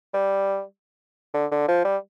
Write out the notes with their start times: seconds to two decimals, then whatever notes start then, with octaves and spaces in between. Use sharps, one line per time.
0.14 G3
1.34 D3
1.52 D3
1.68 F3
1.85 G3